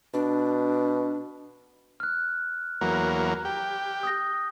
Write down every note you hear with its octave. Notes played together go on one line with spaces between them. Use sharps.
B2 D4
F6 F#6
E2 F#3 A#3
G4
D#6 G6 A#6